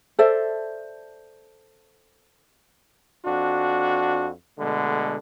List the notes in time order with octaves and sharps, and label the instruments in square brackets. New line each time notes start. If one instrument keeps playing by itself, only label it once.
[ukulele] A4 C5 D5 E5
[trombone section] F2 D4 F#4
B2 D3 G#3 A3